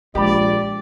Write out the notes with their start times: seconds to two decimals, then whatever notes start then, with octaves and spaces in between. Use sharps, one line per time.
0.15 A#1 G#3 G4 D5 B5